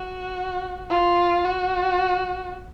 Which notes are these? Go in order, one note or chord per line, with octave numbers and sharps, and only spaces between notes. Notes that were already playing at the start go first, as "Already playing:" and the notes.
Already playing: F#4
F4
F#4